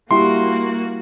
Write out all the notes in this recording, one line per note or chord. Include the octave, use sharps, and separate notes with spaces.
G3 A#3 E4 F#4 G4 C6